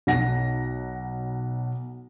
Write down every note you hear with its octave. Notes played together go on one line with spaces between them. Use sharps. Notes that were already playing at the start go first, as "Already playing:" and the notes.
B1 F#5 A#6